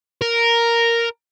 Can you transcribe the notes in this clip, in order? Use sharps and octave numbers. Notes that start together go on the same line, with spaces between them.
A#4